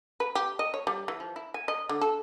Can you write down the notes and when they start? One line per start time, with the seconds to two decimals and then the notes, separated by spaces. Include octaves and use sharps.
0.20 B4
0.35 G4
0.59 D#5
0.74 C#5
0.87 G3
1.08 E3
1.20 F3
1.36 E4
1.54 G#5
1.68 D#5
1.89 D3
2.01 A4